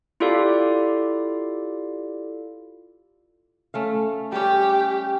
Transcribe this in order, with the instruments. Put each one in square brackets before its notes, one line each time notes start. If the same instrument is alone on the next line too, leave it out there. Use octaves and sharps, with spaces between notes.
[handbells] E4 F4 G4 A4 D5 F5
[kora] A3 C#4 F5
[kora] G3 C#4 [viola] G4